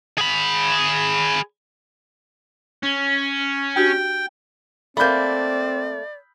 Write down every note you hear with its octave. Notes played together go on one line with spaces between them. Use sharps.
G#4 B5
C#4
D4 F#4 G4 G5
A3 A#3 C4 D5 B5 G6